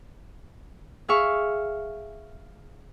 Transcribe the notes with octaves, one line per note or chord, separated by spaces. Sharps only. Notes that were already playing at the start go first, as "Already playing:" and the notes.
G#4 E5 F5 C#6